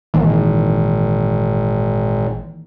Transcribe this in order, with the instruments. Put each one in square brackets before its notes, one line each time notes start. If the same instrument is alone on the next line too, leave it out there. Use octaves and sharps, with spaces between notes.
[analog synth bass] G#1 [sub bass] A#2 [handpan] D#3 E3 A#3